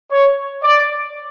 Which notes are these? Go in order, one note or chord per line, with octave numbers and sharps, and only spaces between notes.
C#5
D5